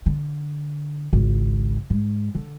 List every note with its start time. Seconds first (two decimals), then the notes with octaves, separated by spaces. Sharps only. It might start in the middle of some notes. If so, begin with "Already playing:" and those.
0.06 D3
1.13 G#1 C#2
1.90 G#2
2.35 D3